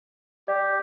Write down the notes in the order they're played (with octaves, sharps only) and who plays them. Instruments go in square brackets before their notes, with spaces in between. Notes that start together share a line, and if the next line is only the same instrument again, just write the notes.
[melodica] G4 [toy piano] D5